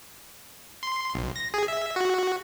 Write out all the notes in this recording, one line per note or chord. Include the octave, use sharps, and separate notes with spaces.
C6
B1
A#6
G#4
E5
F#4